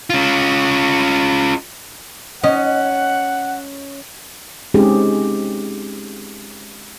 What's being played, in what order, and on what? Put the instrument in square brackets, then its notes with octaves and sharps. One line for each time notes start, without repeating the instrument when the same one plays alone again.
[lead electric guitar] C#4 F4
[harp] C#4 [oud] D#5 [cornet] F#5
[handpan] G#3 C4 C#4 D#4 G4 G#4